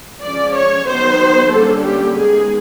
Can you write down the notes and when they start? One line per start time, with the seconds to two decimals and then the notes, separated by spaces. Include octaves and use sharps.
0.22 F3 G#3 C#4 D5
0.55 C#5
0.87 D#3 F#3 B3 C5
1.52 D3 G3 A#3 C#4 A4
1.85 G4
2.17 D#3 G#3 B3 G#4